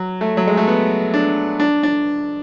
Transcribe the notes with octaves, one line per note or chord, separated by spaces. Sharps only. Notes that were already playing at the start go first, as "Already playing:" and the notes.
Already playing: F#3
A3
F#3
G#3
A3
B3
D4
D4
D4